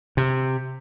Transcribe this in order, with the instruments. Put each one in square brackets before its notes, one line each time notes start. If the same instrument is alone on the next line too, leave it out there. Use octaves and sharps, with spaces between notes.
[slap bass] C3